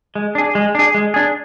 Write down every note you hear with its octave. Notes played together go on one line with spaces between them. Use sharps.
G#3
D4 G#4
G#3
D4 G#4
G#3
D4 G#4